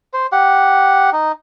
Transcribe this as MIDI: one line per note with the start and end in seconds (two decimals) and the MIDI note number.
0.13 0.27 72
0.32 1.10 67
0.32 1.10 78
1.12 1.32 63